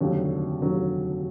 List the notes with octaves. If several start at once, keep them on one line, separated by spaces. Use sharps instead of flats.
F1 D#2 D3 F#3
F1 D#2 D3 F#3